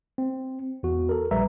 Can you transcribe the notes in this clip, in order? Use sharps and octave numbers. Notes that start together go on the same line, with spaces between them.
C4
E2 F#4
A4 A#4
A#1 G3 B4 E5 A#5